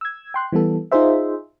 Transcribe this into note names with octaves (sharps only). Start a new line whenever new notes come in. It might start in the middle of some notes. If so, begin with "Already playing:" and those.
E6 G#6
G5 C6 F#6
E3 G3 B3 A4
D#4 F4 G#4 C5 E5